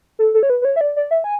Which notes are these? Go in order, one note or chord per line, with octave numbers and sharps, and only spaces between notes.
A4
A4
C#5
B4
B4
C#5
E5
D5
D5
E5
G#5